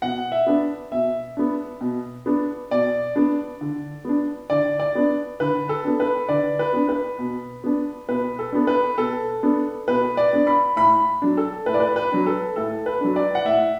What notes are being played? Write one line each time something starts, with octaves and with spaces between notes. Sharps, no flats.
B2 F#5
E5
B3 D4
B2 E5
B3 D4
B2
B3 D4
B2 D5
B3 D4
D3
B3 D4
D3 D5
D5
B3 D4
D3 B4
A4
B3 D4
B4
D3 D5
B4
B3 D4
B4
B2
B3 D4
B2 B4
A4
B3 D4
B4
B2 A4
B3 D4
B2 B4
D5
B3 D4
B5
A2 B5
F#3 D4
A4
A2 B4
D5
B4
B4
F#3 D4
A4
A2 A4
B4
F#3 D4
D5
F#5
A2 E5